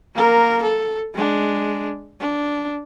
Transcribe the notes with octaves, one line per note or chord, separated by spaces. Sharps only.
A#3 A#4
A4
G#3 D4
D4